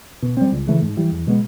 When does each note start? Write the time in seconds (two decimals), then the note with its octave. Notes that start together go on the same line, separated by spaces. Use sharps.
0.22 B2
0.37 G3 C4
0.52 C#2
0.67 C#3 E3 A3
0.82 G#2
0.97 E3 G3
1.11 E2
1.27 B2 G#3 B3